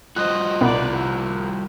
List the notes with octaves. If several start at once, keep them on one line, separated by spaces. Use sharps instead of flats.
G3 F4 F#4 C5 D#5 F#6
C2 B3 B4 D5
E4